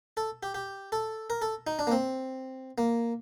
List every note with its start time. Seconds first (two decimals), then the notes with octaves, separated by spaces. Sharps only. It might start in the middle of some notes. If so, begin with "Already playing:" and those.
0.17 A4
0.43 G4
0.54 G4
0.92 A4
1.30 A#4
1.42 A4
1.67 D#4
1.79 D4
1.87 A#3
1.92 C4
2.78 A#3